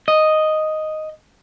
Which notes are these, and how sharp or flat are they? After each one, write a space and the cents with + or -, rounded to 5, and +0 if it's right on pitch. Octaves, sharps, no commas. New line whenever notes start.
D#5 +0